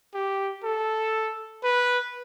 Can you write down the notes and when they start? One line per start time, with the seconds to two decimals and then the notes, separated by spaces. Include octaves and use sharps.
0.14 G4
0.64 A4
1.63 B4